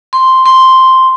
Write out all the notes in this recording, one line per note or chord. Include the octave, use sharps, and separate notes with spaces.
C6
C6